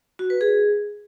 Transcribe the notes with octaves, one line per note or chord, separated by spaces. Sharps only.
F#4
B4
G#4